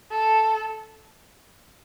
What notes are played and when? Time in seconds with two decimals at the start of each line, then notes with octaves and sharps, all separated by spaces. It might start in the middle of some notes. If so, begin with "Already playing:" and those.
0.11 A4